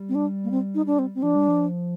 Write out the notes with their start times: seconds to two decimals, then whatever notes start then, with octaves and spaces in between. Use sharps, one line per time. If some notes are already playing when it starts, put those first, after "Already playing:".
Already playing: G3
0.09 C4
0.15 D4
0.44 A#3
0.51 C4
0.75 D#4
0.87 D4
0.99 C4
1.15 C4
1.22 F3 D4
1.35 G3
1.48 F3